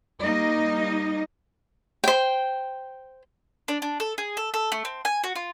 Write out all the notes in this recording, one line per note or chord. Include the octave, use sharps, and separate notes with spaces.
G3 A#3 D#4 D#5
C5 G5
D4
D4
A4
G#4
A4
A4
A3
C4
G#5
F#4
F4